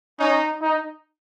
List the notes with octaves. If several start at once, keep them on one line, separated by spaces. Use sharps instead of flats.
C#4 D#4
D#4